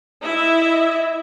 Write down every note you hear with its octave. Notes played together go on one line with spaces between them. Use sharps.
E4 D#5 E5